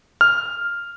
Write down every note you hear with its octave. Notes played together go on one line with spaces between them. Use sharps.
F6